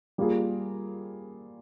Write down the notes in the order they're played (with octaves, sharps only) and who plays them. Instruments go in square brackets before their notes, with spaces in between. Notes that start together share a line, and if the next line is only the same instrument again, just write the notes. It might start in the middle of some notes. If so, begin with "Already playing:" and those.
[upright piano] G3 A#3 F4 G#4